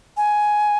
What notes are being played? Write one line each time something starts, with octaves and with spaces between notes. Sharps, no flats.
G#5